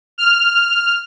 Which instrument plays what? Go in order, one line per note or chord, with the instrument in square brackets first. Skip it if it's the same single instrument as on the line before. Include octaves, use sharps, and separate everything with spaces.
[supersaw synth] F6